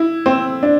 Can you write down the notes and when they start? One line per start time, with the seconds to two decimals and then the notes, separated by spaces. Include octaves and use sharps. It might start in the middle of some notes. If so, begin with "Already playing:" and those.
Already playing: E4
0.26 C4
0.63 D4